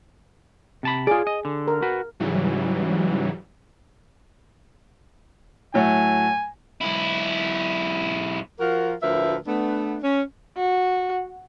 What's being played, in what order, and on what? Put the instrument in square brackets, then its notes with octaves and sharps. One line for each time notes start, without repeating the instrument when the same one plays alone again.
[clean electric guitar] C3 A5 B5
[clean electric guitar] F4 D5 [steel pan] G#4
[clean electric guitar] D#5
D3
[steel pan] A#4
[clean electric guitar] F#4 B4
[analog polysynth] G#2 C#3 E3 F#3 G3
[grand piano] A2 F#3 A3 [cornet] G#5
[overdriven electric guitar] B1 E4
[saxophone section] F3 F4 F#4 A#4
D2 A2 F3 A#4 B4 E5
A3 B3 D4
C#4
[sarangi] F#4